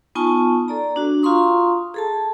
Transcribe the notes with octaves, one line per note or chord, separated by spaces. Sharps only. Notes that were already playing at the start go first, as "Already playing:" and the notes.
B3 D#4 F4 G#5 A5 C#6
A4 D5 A#5
D4 F#4
F4 F5 A#5 C6 C#6 D#6
G#4 A4 A5